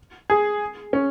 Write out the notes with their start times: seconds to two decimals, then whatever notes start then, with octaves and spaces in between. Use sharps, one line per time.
0.30 G#4
0.93 C#4